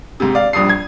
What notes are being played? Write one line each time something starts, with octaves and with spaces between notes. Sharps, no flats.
G#2 C3
D5 F5
A#1 G2 D#6 C7
G#6